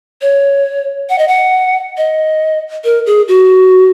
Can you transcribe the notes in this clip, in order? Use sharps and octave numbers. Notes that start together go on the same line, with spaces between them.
C#5
F#5
D#5
F#5
D#5
A#4
G#4
F#4